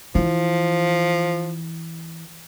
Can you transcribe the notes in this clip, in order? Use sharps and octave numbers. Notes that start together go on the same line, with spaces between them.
E3 F3